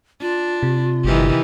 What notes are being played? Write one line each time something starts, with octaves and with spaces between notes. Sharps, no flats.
D4 F4
C3
G1 D#3 E3 G4